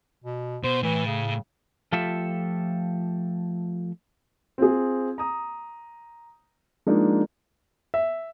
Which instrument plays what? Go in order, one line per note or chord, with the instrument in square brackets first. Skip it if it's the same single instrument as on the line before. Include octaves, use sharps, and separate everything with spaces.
[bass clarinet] B2
[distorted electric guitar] B2 [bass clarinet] C5
[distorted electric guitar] A2 [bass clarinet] E3
[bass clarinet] C#3
[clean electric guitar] F3 A3 F4 G4 A4 E5
[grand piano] C4 F4 G#4
A#5 D#6
F3 G#3 A#3 D4 D#4
E5